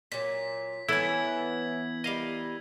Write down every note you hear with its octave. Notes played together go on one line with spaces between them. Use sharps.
A#2 F#3 B6
E3 B3 C#4 E4 A4 G#5 E6 G#6
G3 A#4 D#5 F5